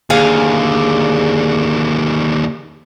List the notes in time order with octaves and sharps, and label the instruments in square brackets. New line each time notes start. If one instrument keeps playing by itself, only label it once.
[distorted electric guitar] D#2 D3 [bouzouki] G#4 F5